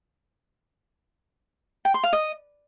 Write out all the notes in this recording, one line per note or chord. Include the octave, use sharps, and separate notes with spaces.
G5
C6
F5
D#5